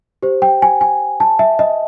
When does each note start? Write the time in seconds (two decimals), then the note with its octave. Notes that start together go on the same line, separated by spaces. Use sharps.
0.23 G4 C5
0.42 G5
0.62 G#5
0.81 G#5
1.20 A5
1.39 E5
1.59 D#5